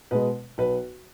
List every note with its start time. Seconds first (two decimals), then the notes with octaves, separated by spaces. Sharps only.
0.11 B2 G#3 B4
0.58 B1 B4